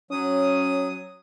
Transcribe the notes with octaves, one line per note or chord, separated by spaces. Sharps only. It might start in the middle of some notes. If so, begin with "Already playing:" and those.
F#3 C#4 D#6